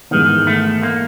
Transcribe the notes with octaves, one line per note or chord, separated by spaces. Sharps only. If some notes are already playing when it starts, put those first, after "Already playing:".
G#2 D#3 E3 G#3 B3
A3
A#3